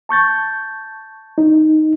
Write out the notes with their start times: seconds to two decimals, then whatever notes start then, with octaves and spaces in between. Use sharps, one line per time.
0.09 A5 C#6 G6 A6
1.38 D#4